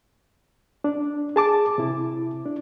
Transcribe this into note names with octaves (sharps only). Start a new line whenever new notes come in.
D4
G#4 A5 D6
C3 E4
D4